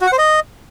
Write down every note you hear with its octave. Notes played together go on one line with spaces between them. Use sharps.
F#4
F#5
C5
D#5